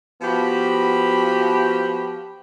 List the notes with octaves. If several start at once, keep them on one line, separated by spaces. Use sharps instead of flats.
F3 B3 F#4 G4 B4 B5